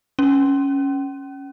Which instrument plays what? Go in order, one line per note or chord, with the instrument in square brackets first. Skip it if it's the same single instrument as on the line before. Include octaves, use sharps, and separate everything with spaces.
[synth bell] C#4